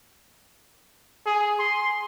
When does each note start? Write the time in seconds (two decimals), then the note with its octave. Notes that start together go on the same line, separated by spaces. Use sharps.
1.26 G#4
1.60 C6